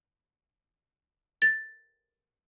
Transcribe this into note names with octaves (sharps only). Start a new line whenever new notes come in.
A6